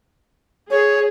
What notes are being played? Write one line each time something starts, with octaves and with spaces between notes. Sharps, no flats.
G#4 C#5